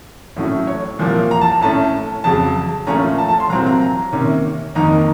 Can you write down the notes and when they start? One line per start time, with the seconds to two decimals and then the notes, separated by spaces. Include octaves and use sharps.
0.37 A2 F#3 A3 C#4
0.67 C#5
0.99 C2 A#2 F3 A#3
1.31 A#5
1.41 A5
1.61 A2 A3 C#4 A5
2.24 F2 C#3 F#3 A5
2.87 A#2 F3 A3 C#4 A#5
3.18 A5
3.28 A5
3.40 C6
3.49 C2 A#2 F#3 C4 A#5
3.66 A#5
3.81 A#5
4.12 C3 D#3 A#3 C#4
4.75 F2 D#3 A#3 D#4 A#5